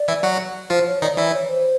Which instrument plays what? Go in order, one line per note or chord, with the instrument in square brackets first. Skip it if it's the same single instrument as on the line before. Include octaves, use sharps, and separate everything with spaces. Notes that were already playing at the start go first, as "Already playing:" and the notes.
Already playing: [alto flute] D5
[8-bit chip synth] E3 E4
F#3 F#4
[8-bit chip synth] F3 F4 [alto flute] C5
[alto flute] C#5
[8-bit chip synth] D#3 D#4 [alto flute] D5
[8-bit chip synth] E3 E4 [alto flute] D5
[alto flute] C#5
C5